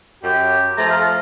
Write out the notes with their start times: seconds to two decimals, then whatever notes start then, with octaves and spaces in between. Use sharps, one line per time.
0.24 F#2 G4
0.78 F3 A3 A#5
0.89 F5